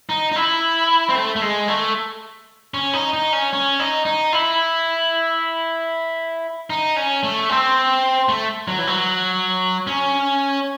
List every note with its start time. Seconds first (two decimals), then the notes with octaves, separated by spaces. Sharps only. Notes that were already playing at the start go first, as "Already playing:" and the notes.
0.09 D#4
0.32 D#4
0.36 E4
1.09 C4
1.15 A3
1.36 A3
1.42 G#3
1.68 A3
2.74 C#4
2.93 D#4
3.13 D#4
3.33 C#4
3.53 C#4
3.79 D#4
4.05 D#4
4.32 E4
6.70 D#4
6.96 C#4
7.23 A3
7.49 C4
8.29 A3
8.68 F#3
8.78 E3
8.87 F#3
9.87 C#4